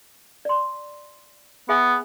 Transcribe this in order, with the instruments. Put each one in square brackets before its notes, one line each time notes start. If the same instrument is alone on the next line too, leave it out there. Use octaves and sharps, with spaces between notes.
[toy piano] D5 C6
[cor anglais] B3 [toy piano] G#4 E5 G#5